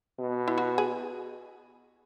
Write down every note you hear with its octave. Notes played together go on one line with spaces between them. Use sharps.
B2
E4
F#4
G#4